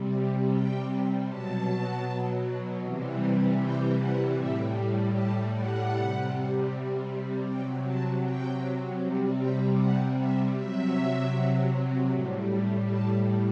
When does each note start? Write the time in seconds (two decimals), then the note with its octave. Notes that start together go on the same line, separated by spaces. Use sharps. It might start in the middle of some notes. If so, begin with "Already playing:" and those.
Already playing: C3 G3
0.51 G5
1.27 B2 F#3 A5
2.82 C3 E3 G3
3.60 G5
3.99 F#5
4.37 A2 G3 E5
5.14 A5
5.53 F#5
5.92 C3 G3
7.46 C3 F#3 G5
7.86 A5
8.24 G5
9.01 C3 G3
9.40 G5
9.78 F#5
10.17 E5
10.55 C3 F#3 E5
12.10 A2 G3
12.87 A5